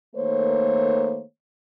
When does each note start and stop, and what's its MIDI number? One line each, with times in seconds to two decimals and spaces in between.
0.15 1.23 51
0.15 1.23 57
0.15 1.23 58
0.15 1.23 72
0.15 1.23 73